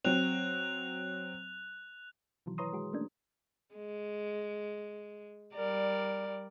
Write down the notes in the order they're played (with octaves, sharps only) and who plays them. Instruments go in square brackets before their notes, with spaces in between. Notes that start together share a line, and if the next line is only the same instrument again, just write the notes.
[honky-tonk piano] F#3 C4 [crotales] F#6 F7
[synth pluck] B2 D#3 E3 F#3
E4 B4 C#5 A#5 C6 D#6
G#3 F#4 G#4
A3 A#3 C#4 D4
[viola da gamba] G#3
G3 A#4 D5